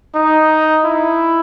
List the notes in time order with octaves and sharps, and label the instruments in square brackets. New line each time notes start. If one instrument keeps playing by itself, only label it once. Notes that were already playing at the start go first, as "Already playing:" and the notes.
[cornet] D#4
E4